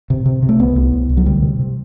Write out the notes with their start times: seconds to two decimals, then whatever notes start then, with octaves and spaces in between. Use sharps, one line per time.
0.10 C3
0.26 C3
0.43 C3
0.49 A3
0.59 C2 B3
0.76 C2
0.93 C2
1.09 C2
1.17 F#3
1.26 D2 G3
1.42 C3
1.59 C3